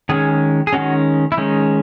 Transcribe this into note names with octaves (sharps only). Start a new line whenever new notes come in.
D#3 G#3 C#4 G#4
G#4
D#3 G#3 C#4 F#4
E4
D#3 G#3 C#4 D#4